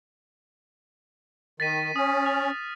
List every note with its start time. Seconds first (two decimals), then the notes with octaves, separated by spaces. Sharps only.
1.60 D#3 A6 B6 D#7
1.96 C#4 D#6
2.25 F6 F7